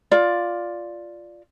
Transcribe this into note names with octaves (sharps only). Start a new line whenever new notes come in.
F4 D5